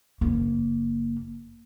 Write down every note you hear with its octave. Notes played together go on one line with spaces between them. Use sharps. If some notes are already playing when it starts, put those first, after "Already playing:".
F#1 A#3